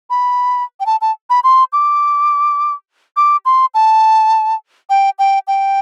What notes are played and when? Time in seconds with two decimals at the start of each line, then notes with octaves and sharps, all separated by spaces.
0.10 B5
0.80 G5
0.86 A5
1.01 A5
1.30 B5
1.44 C6
1.73 D6
3.17 D6
3.45 C6
3.74 A5
4.90 G5
5.19 G5
5.47 G5